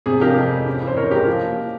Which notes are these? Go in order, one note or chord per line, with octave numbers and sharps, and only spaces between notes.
C3 G#4
F3 G4 A#4
F2
G#3
C#3
E3
C5
F2 A#4 C#5
G#3 G4 A#4
F3
A#3